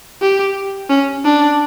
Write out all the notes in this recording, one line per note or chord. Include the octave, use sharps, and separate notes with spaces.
G4
C#4
D4